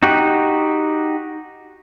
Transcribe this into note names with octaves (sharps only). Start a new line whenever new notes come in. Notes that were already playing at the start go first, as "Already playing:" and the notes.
D#4 F#4 G4 F#5